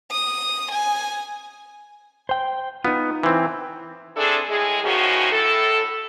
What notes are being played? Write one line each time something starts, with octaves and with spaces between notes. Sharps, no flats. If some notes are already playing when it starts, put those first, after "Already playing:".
D#6
G#5
C5 G5
B3 D#4 F4
E3 C4
C4 D4 E4 G#4 A4
A2 G#3 G#4
A2 D#3 F3 C#4 F#4
A2 A4